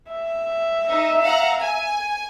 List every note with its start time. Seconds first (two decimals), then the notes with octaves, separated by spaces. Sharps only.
0.11 E5
0.87 D#4
1.22 F5 F#5 A#5
1.58 G#5